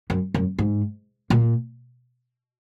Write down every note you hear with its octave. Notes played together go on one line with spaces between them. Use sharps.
F#2
F#2
G#2
A#2